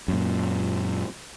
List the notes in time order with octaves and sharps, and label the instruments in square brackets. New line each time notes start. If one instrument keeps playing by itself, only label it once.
[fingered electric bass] F#2 A#2